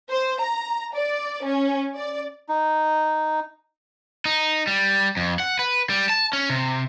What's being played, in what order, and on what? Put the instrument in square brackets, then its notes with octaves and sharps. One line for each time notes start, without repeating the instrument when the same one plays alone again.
[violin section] C5
A#5
D5
C#4
D5
[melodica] D#4
[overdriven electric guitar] D#4
G3
F2
F#5
B4
G3
A5
C#4
C3